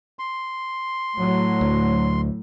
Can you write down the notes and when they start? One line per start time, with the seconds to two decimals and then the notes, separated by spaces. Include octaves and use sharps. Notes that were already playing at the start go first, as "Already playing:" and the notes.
0.19 C6
1.17 A2 F#3
1.61 D2